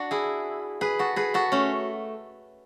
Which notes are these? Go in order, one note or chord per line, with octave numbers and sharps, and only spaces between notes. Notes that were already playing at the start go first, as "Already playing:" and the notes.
Already playing: D4 F#4
E4 G#4
G#4 B4
F#4 A4
G#4 B4
F#4 A4
A3 C#4